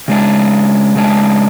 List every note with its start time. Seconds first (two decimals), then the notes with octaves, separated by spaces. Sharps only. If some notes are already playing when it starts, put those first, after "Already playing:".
0.08 C#3 G#3 D4
0.96 C#3 G#3 D4